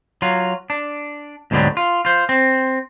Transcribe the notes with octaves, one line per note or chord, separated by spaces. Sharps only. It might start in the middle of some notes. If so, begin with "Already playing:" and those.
F#3 F4
D4
D2 G#2 B2 D3 F#3 G3
F4
F4 C5
C4